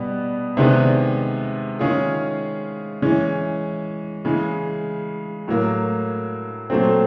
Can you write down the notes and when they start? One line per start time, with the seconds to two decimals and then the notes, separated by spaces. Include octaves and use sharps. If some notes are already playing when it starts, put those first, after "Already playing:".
Already playing: B2 G3 B3
0.57 C3 D#3 G#3 B3 D4
1.79 D#3 G#3 C#4 F4 G#4
3.02 E3 G#3 C#4
4.25 C#3 E3 G#3
5.48 A2 F#3 A#3
6.70 A#2 F#3 A3 C4